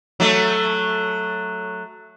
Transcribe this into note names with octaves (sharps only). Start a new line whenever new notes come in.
F#3 A3